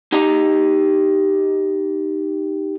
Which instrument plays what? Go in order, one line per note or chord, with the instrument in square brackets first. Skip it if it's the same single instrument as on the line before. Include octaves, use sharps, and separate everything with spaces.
[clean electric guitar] D#4 G4 D#5 A#5